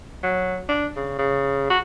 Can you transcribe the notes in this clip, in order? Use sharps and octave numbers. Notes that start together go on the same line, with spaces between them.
F#3
D4
C#3
C#3
F#4